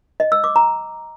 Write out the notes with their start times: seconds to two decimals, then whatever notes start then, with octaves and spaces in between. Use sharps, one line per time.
0.20 D#5
0.32 E6
0.44 D6
0.56 A#5